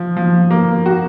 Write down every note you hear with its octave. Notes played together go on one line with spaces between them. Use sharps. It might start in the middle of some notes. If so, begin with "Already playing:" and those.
Already playing: F3
F3
A#3
F#4